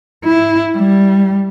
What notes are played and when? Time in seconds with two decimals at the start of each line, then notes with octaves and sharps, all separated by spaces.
0.24 E4
0.77 G3